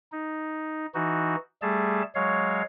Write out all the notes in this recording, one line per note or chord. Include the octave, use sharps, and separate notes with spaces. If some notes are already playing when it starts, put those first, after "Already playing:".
D#4
E3 D#4 F#4
G3 A3 G#4 A5
F#3 G#3 C#5 F5